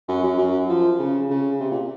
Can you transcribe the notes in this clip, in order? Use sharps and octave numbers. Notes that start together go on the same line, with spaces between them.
F#2
F#2
F#2
F3
C#3
C#3
C3
A#2